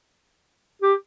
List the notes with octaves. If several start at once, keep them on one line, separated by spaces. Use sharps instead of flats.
G4